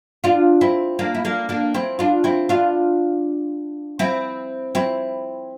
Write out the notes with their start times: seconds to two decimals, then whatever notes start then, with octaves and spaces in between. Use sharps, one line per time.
0.24 D4 F4
0.61 C4 E4
0.99 A#3 D4
1.15 E4
1.25 A#3 D4
1.49 A#3 D4
1.74 C4 E4
1.99 D4 F4
2.24 C4 E4
2.49 D4 F4
3.99 C4 E4
4.75 C4 E4